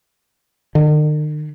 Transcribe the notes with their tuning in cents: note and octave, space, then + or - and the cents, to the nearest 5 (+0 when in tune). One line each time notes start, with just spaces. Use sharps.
D#3 -45